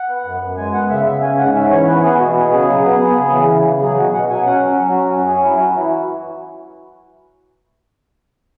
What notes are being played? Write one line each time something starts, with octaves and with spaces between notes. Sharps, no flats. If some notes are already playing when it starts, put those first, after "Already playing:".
Already playing: F#5
B3
F#2
F#2
G#3 G#5
B3 F#5
C#3 E5
C#3 E5
C#4 G#5
G#2 F#5
C#4 E5
E3 C#5
B3 B4
B3 G#4
B2 F#4
B3 G#4
C#3 G#4
F#3
B3
B3
C#3
E3
C#3
C#3
F#3 G#4
B2 F#4
B2 F#5
F#3 G#5
C#4 F#5
F#3
F#3
F#4
C#4
F#2 F#4
C#4 G#4
F#3 E4
F#3 F#4
E3 E4
F#4